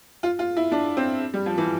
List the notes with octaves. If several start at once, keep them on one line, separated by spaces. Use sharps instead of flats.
F4
F4
E4
D4
C4
G3
F3
E3